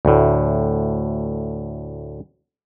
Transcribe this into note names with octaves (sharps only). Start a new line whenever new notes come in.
D2 A2